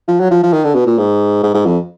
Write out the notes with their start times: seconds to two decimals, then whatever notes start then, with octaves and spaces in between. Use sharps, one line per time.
0.08 F3
0.20 F#3
0.31 F3
0.43 F3
0.53 D#3
0.65 D3
0.75 B2
0.86 A#2
0.98 G#2
1.43 G#2
1.54 G#2
1.66 F2